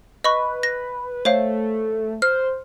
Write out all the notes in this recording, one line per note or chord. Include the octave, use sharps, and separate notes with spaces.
B4 D#5 B5 C#6
A#6
A3 C5 C#5 F5
C5 F6